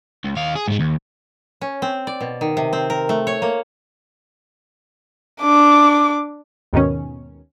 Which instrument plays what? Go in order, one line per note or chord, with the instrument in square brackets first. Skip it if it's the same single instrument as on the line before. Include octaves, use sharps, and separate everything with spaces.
[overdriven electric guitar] C#2
D#2 F5
G#4
G#2 G#3
D#2
[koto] C#4
C4
D5
B2
D#3
C3
C4
A#4
A3
C#5
A#3
[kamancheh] D4 D6
[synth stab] D#2 G#2 B2 D#3 C#4